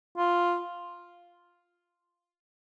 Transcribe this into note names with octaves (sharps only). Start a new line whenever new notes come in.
F4